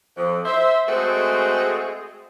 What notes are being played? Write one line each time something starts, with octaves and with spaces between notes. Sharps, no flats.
F2
C5 E5
G#3 A3 C4 F#4 G#4